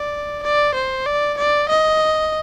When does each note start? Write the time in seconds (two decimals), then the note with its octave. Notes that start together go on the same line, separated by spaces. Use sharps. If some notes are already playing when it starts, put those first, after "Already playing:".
Already playing: D5
0.43 D5
0.74 C5
1.06 D5
1.37 D5
1.69 D#5